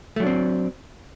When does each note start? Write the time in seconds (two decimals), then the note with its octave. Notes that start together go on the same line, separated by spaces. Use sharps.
0.16 A3
0.20 F#3
0.23 D4
0.27 C4